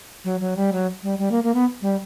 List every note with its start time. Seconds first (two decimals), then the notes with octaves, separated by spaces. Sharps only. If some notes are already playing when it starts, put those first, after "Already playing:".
0.25 F#3
0.40 F#3
0.56 G3
0.72 F#3
1.03 G3
1.19 G3
1.31 A#3
1.44 A#3
1.54 B3
1.82 G3